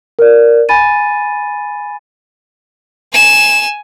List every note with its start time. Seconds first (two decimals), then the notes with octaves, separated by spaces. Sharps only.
0.19 A#4 D5
0.69 G#5 B5 A6 D#7
3.13 G#5 E7